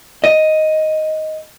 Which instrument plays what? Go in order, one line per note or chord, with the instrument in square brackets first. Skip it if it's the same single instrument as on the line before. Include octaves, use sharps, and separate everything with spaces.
[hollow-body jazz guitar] D#5